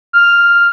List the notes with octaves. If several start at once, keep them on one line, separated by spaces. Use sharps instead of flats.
F6